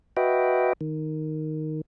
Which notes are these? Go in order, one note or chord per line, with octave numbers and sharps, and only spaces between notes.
F#4 B4 D#5 E5 G5
D#3